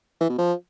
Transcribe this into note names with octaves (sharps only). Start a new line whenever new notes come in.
E3
B2
F3